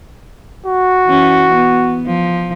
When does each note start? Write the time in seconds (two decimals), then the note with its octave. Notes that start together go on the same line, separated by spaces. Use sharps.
0.66 F#4
1.06 E3 C#4
1.54 B3
2.06 F3